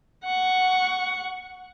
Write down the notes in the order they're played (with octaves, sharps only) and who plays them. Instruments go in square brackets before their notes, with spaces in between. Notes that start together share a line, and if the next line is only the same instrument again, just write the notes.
[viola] F#5 C#6